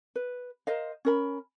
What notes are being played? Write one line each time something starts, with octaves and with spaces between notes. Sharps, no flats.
B4
A#4 C5 D#5 F5
C#4 A#4 B5